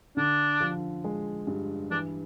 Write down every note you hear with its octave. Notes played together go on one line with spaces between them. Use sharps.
D3 D4
F3
G#3
G2
E3 D4